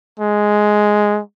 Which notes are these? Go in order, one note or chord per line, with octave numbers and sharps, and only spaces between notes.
G#3